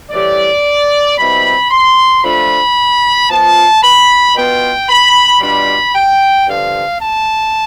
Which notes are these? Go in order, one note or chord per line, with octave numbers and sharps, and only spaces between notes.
A2 E3 G3 D5
B2 G3 C4 E4 B5
C6
F3 A3 D4 F4 B5
F3 B3 F4 A5
B5
B2 B3 F4 G5
B5
B2 G3 D4 F4 B5
G5
G2 D3 F3 F5
A5